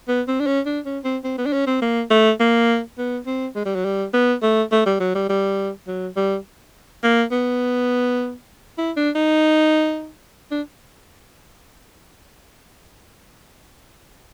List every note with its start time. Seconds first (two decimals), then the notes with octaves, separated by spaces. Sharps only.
0.08 B3
0.28 C4
0.40 D4
0.47 C#4
0.66 D4
0.85 C#4
1.04 C4
1.24 C4
1.38 B3
1.46 D4
1.53 C#4
1.67 C4
1.82 A#3
2.11 A3
2.40 A#3
2.98 B3
3.27 C4
3.56 G#3
3.65 G3
3.75 F#3
3.85 G3
4.14 B3
4.42 A3
4.72 A3
4.86 G3
5.00 F#3
5.15 G3
5.29 G3
5.88 F#3
6.16 G3
7.03 A#3
7.32 B3
8.78 E4
8.97 D4
9.15 D#4
10.51 D4